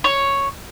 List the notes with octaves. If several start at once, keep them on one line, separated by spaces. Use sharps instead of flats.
C#5